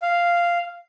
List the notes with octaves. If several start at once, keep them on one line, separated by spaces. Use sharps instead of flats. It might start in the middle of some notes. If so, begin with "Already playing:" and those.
F5